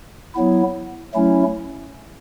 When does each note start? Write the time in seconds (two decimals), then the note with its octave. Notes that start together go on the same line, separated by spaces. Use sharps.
0.35 F#3 B3 E4
1.14 F#3 A3 C#4 E4